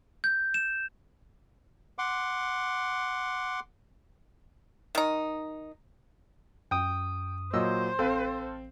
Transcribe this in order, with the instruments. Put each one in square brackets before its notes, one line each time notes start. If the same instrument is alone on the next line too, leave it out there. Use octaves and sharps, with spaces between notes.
[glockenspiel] G6
E7
[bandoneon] F#5 C6 D6
[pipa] D#3 D#4
[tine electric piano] F#2 D#6 [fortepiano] G5
[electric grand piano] A#2 F#3 [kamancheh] C5 [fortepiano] D#5 E6
[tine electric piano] A1 [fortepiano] C4 [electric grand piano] A4 F5